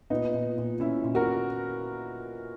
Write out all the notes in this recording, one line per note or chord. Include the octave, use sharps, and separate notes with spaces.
A#2 B3 D#4
A#2
A#2
A#2 C#4 E4
A#2
F#4 A#4